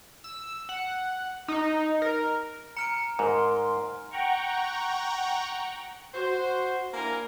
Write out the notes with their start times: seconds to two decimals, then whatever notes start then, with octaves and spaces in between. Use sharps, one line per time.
0.24 E6
0.69 F#5
1.48 D#4
2.02 A#4
2.77 A#5 F6 C#7 D7
3.19 G#2 A#4 C6
4.11 F#5 G5 A#5 C#6
6.14 F#4 C5
6.93 A#3 D4 E4 A#4 G#5 A#5